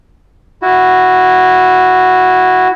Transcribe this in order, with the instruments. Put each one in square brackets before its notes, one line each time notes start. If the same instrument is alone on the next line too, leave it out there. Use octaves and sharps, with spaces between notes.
[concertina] E4 F#4